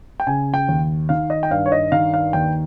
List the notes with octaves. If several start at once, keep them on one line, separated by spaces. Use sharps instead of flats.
G5
C#3 G#5
G5
D#2
D#3 F5
D#5
G5
G2 F5
C#5
D#5
D#3 F5
F5
D#2 G5